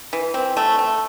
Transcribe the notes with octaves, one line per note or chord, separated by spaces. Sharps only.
E3
C4
A3
A3